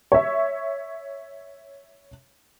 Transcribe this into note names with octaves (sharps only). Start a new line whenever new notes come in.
C#5 E5